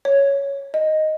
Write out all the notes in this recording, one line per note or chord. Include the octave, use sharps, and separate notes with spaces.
C#5
D#5